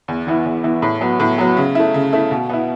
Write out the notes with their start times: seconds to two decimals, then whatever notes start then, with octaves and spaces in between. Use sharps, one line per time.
0.08 E2
0.27 E3 B3 E4
0.46 E2
0.64 E3 B3 E4
0.82 A2
1.01 F#3 B3
1.20 A2
1.38 F#3 B3
1.57 C#3
1.75 A3 E4
1.94 C#3
2.13 A3 E4
2.31 B2
2.50 B3 E4